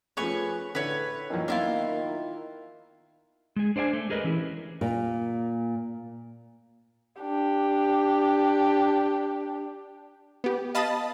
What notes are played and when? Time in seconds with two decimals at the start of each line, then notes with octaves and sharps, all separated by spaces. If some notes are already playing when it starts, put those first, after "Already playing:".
0.17 F3 A3 C#4 G#4 B4 C#5 C#6
0.75 A2 D3 B4 C#5
1.30 F#2 A#2 D#3 E3
1.48 A#3 B3 D4 E4 F4
3.56 G#3 G#4
3.76 D4 C5 D5 F5 G#5
3.93 A3
4.10 G4 G#4 A#4 B4 D#5
4.24 E3 C#4 E4
4.81 A#2
7.21 D4 G4
10.44 B3 G4
10.75 D#5 F5 A5 B5 D#6 A6